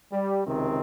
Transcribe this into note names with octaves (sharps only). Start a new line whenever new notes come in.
G3
C#2 C3 D#3 C4